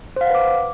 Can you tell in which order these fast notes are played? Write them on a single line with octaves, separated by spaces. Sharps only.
C5 F5 F#5 B4 D6